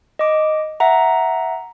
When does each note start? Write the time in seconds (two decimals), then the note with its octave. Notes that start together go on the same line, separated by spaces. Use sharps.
0.19 D#5 D6
0.80 E5 F#5 A#5